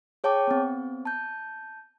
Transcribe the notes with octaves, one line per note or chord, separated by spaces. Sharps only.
G#4 C#5 G5 A5 D6
B3 C4
A5 G6